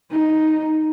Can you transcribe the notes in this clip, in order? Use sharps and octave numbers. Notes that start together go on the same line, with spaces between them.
D#4